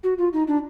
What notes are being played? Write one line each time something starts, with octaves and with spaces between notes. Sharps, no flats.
F#4
F4
D#4
D4